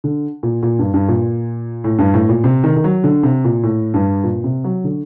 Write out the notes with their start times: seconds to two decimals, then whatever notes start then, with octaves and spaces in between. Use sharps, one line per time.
0.04 D3
0.43 A#2
0.63 A#2
0.79 G2
0.94 G2
1.08 A#2
1.84 A2
1.99 G2
2.14 A2
2.29 A#2
2.44 C3
2.64 D#3
2.76 D#3
2.84 F#3
3.04 D3
3.23 C3
3.44 A#2
3.63 A2
3.94 G2
4.24 A#2
4.44 C3
4.64 F#3
4.84 D3